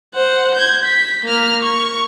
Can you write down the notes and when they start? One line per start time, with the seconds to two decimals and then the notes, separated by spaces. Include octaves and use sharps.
0.14 C5 F#5
0.55 G6 G#6
0.85 B6
1.24 A#3 F6
1.63 C#6